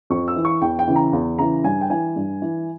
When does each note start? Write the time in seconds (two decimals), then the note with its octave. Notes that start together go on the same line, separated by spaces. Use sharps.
0.10 F2 C#6
0.28 E6
0.36 E3
0.45 C#6
0.62 E2 G5
0.79 G5
0.88 C#3 E3
0.96 A#5
1.13 E2
1.39 C#3 E3 A#5
1.64 G2 G#5
1.81 G5
1.90 E3 G#5
2.16 G2
2.42 E3